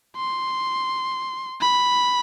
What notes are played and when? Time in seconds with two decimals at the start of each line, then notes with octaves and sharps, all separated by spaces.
0.16 C6
1.61 B5